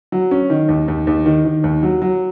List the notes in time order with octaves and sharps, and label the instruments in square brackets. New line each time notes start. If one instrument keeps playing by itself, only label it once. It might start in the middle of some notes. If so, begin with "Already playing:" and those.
[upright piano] F#3
C#4
D#3
D#2
D#2
D#2
D#3
D#3
D#2
F#3
F#3